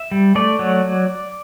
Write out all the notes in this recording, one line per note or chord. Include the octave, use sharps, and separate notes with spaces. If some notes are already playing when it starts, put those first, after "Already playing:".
Already playing: E5
G3
A3 D5
F#3